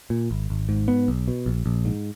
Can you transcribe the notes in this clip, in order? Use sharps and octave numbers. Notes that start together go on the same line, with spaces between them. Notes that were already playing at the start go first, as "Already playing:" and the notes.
A#2
G#1
G#1
G#2
B3
B1
B2
A#1
A#1
G#2